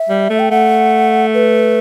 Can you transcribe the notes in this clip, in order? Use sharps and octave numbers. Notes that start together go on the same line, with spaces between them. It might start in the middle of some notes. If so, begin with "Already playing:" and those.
Already playing: E5
G3
A3
G5
A3 F#5
B4